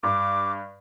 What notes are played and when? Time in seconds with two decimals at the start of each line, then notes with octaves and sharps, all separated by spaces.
0.03 G2 D6